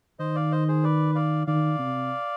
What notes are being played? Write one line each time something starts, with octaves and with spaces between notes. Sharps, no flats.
D#3 C5 D#5
D5 F5
C5 D#5
G#4 C5
B4 D5
D5 F5
D#3 D5 F5
C3